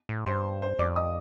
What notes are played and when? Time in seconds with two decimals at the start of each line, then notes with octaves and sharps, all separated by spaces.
0.09 A2
0.26 G2 C5 C6
0.62 C5 C6
0.79 F2 D5 D6
0.96 D#5 D#6